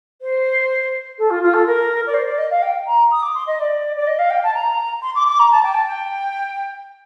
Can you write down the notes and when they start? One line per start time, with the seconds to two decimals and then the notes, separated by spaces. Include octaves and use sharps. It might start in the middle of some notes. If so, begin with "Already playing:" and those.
0.22 C5
1.19 A4
1.30 F4
1.43 F4
1.54 A4
1.67 A#4
2.07 D5
2.14 C5
2.27 D5
2.38 D#5
2.50 F5
2.62 G5
2.86 A#5
3.11 D#6
3.22 D6
3.35 C6
3.47 D#5
3.59 D5
3.96 D5
4.07 D#5
4.19 F5
4.30 G5
4.43 A5
4.54 A#5
5.02 C6
5.15 D6
5.27 D6
5.39 A#5
5.51 A5
5.63 G5
5.74 A5
5.87 G5